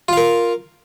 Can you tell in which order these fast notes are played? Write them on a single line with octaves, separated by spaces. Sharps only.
F4 F5 A#4